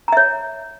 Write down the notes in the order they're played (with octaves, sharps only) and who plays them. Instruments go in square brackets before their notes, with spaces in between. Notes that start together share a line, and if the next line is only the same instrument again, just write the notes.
[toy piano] A#5
E5
C#5